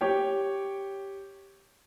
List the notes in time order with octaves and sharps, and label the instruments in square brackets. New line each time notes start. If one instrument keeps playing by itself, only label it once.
[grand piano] G4 C#5 G5